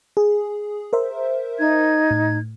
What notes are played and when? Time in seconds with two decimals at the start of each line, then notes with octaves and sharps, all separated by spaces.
0.17 G#4
0.93 A#4 C5 E5
1.59 D#4 G#6
2.11 A2